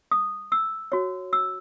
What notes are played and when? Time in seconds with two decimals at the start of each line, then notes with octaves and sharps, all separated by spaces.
0.11 D#6
0.52 E6
0.92 F#4 C#5
1.33 E6